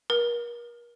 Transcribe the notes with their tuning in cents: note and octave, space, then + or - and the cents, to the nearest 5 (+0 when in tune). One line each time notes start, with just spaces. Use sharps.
A#4 +40